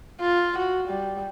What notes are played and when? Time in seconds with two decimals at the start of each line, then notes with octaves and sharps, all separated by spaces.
0.21 F4
0.58 F#4
0.88 G3